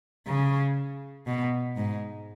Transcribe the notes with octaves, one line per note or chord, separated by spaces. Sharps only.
C#3
B2
G#2